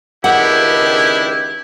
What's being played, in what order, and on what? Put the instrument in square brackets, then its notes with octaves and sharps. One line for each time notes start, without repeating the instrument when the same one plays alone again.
[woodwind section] C#2 D#3 G4 [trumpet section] B3 D4 E4 [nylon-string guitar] F#5